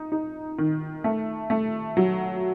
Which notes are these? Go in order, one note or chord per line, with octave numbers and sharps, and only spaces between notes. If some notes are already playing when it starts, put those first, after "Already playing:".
Already playing: D#4
D#4
D#3
A3
A3
F#3